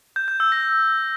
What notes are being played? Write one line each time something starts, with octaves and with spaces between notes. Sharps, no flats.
G6
G6
E6
A#6